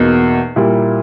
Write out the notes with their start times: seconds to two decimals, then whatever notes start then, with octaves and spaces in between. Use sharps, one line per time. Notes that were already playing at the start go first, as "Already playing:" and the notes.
Already playing: E2 B2 A#3 D#4
0.56 A#2 G3 A#3 E4